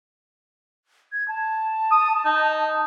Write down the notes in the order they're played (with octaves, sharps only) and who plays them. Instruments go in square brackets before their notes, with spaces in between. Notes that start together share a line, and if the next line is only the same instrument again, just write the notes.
[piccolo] G#6
A5
[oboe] D#6
D#4